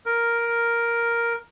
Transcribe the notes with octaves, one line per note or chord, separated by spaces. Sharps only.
A#4